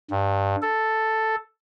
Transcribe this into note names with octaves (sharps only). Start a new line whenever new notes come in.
G2
A4